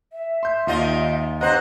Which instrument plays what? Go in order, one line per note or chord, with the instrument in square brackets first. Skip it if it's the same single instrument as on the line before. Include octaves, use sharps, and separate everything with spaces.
[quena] E5
[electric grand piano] C6 G6
[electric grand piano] D#2 [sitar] D#3 F4 D#5
[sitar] G2 C4 C5 [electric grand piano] D#5 F#5 A#5 [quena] F#6